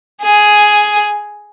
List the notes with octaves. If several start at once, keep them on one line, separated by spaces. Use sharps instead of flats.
G#4